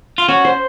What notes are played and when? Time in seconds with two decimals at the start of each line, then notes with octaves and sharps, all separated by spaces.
0.18 F4
0.28 C#4 F#4
0.45 C5